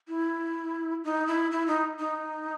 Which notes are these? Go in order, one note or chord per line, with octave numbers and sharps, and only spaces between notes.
E4
D#4
E4
E4
D#4
D#4